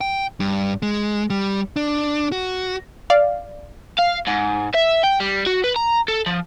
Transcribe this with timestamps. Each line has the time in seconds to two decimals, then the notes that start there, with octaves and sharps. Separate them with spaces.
0.01 G5
0.40 G2
0.82 G#3
1.30 G3
1.76 D4
2.32 F#4
3.10 D5 F5
3.99 F5
4.27 G#2
4.74 E5
5.03 G5
5.20 G3
5.46 F#4
5.64 B4
5.76 A#5
6.08 A4
6.26 F3